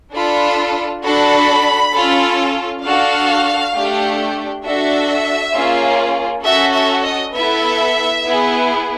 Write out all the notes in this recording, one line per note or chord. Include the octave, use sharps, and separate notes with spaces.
D4 F4 A4 B5
D4 F#4 A4 B5
C#4 F4 A4
D4 F#4 A4 F5
A3 D4 G4
D4 F#4 A4 E5
A#3 C#4 F4 G#4
C#4 F#4 A4 E5
E5
D#5
B3 E4 A4 E5
B3 E4 G#4